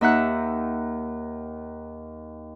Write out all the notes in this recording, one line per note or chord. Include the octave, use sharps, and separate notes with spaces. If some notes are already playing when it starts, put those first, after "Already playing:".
D#2 D#4 E5 F#5 F#6